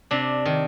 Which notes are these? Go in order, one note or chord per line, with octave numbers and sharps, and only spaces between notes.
C3 D4
D#3